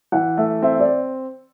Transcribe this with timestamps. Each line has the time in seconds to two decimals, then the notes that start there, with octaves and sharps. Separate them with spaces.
0.12 E3 F#5
0.37 A3 E5
0.62 C4 E5
0.80 D5